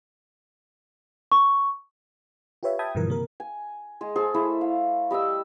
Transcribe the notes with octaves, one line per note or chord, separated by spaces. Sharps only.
C#6
F4 G4 B4 C#5 E5
E5 G5 A5 B5 D#6 G#6
G2 B2 D3 E3 F3 A#4
C3 A#3 A#4
G#5
G#3 G#4
G#4 A4 C5
A3 E4 A4 C5
F5
G3 D#5 C#6 E6